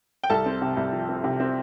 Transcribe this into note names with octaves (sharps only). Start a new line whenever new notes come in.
G5
C2 A4 A5
C4
C3
C2
F3
C4
C3
C4